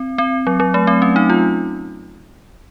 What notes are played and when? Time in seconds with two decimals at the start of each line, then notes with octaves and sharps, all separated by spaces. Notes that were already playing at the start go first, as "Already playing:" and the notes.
Already playing: C4
0.18 C4
0.47 F#3
0.60 F#3
0.74 A3
0.87 C4
1.02 C#4
1.16 D#4
1.30 F4